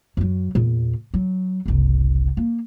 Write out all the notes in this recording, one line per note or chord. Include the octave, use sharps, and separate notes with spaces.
F#2 F#3
E2 A#2
F#3
F#1 C2
A#3